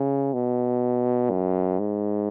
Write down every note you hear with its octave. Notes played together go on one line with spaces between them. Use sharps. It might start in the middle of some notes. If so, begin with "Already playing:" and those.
Already playing: C#3
B2
F#2
G#2